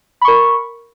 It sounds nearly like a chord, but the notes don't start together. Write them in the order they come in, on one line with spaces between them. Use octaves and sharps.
B5 C#6 A#4